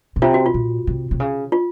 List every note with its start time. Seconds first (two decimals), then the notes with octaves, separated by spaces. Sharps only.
0.16 A#2
0.22 C3 F4
0.34 F#4
0.46 F4
0.54 A#2
0.87 C3
1.11 C3
1.20 C#3
1.52 F4